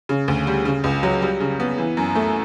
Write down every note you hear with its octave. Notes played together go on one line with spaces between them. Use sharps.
C#3
D2
G3
C#3
C#2
F#3
G3
C#3
B3
E3
F#2
A3